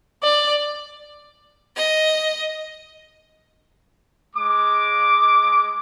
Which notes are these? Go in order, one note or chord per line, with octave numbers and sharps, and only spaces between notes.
D5
D#5
G#3 D6